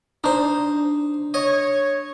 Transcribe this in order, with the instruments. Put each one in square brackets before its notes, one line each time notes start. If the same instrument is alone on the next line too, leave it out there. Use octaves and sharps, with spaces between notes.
[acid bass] D4 [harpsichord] D#4 C5
[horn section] C#5 [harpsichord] D#5